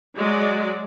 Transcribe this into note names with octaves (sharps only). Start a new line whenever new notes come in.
F#3 G#3 D5